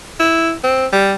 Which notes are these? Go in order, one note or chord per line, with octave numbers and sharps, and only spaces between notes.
E4
C4
G3